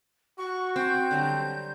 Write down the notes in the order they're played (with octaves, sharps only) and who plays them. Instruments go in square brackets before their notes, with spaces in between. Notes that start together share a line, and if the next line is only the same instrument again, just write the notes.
[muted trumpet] F#4 [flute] C#6
[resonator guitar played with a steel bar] C4 [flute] G6
[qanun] D3 F#3 G3